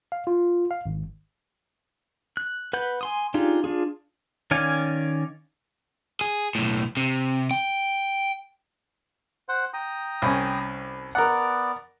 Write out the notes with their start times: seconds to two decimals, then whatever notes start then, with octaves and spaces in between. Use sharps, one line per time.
0.12 F5
0.27 F4
0.71 F5
0.86 G#1
2.37 F#6
2.73 B4 F#5 B5 G6
3.01 G#5 C6 D#6
3.34 D4 D#4 F4 G4 G#4
3.64 D4 F4 G#4
4.51 D#3 C#4 D5 F5 G#5
6.21 G#4
6.55 B1 A2
6.97 C3
7.51 G5
9.49 C5 F#5
9.74 G5 A#5 D#6
10.22 C2 C#4 G#5
11.15 B3 A#4 D5 F#5